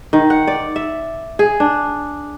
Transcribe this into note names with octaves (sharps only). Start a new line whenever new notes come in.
D#3
F#5
D5
E5
G#4
D4